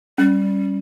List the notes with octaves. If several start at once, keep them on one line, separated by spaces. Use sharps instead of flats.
G3 C#4